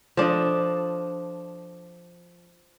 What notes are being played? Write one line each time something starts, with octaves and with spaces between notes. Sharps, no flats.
F3 D4 A4 D#5